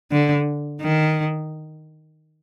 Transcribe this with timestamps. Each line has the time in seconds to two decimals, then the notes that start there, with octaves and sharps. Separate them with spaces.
0.11 D3
0.81 D#3